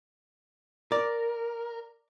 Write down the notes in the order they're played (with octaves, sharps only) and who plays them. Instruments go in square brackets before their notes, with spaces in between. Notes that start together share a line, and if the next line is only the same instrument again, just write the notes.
[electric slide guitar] A#4 [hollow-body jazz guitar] D5